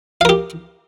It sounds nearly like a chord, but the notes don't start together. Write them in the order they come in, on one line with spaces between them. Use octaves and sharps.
F5 A#4 G4